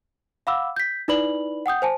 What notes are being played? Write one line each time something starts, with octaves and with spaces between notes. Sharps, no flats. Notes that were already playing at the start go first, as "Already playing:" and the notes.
F5 F#5 B5 D6 E6
G6 B6
D#4 E4 B4 D5 B5 F#7
F#5 G5 D#6 G6
C5 G#5 A5